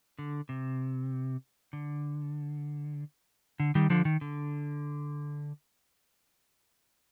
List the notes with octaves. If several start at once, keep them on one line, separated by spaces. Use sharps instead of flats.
D3
C3
D3
D3
D#3 G3
D3 F3
D#3
D3